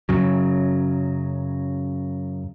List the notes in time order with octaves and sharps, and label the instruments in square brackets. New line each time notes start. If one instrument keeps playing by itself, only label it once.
[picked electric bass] F#2 C#3 F#3